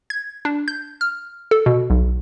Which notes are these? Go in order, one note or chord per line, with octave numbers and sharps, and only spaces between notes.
G#6
D4
G6
F6
A4
B2
B1